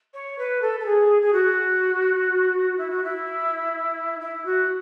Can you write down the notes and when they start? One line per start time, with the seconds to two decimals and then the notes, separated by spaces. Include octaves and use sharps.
0.13 C#5
0.38 B4
0.61 A4
0.79 A4
0.85 G#4
1.22 G#4
1.33 F#4
2.77 E4
2.90 F#4
3.04 E4
4.20 E4
4.45 F#4